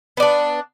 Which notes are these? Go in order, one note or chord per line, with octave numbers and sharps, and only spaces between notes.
B3 D4 D5